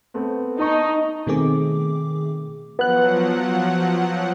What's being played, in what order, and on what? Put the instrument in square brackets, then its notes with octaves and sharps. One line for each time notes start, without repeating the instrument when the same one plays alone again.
[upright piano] A3 B3 C4
[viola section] D#4 [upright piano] D#5 A5 C#6
[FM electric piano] B2 D#3 A3 C4 G#4 D6
[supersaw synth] F3 F#3 F#5 [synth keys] B3 F#6